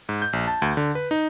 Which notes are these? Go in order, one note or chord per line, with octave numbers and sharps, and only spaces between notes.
G#2
G6
A#1
A5
D2
D3
B4
D#4